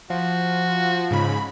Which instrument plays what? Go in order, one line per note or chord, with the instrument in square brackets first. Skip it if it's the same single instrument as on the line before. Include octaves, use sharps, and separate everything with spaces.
[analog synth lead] F3 [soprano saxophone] F#4
[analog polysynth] G#2 C#3 B5